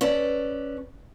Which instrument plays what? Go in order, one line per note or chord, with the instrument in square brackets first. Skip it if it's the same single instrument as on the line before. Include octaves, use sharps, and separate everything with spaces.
[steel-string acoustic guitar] C#4 A4 B4 D5